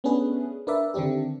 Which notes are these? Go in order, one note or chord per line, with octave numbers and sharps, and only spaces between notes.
A3 B3 C#4 D4 G#4 B4
D4 A#4 B4 D5 E5
D3 D#3 C4 D4 G4